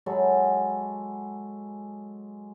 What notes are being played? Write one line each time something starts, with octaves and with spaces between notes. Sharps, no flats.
F#3 G#3 A4 B5